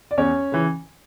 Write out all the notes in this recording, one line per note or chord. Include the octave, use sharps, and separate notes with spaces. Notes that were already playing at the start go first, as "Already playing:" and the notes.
D5
E2 C#4 C#5
C#3 E3